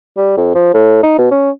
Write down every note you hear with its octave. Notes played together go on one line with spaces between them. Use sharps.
G3
F2
F3
A2
D#4
B2
C#4